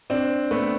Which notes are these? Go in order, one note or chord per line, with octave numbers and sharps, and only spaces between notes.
C4 D4
A3 B3